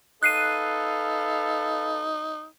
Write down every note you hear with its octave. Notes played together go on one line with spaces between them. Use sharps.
D#4 A4 B4 F5 F#6 C7 D#7